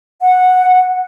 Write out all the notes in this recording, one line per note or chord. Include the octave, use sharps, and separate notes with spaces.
F#5